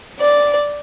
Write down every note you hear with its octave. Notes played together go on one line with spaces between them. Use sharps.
D5